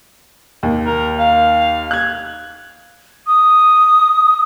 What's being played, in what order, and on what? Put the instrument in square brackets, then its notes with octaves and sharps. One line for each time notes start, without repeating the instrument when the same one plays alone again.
[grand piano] D#2
[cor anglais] A#4
F5
[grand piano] F#6 G#6
[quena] D#6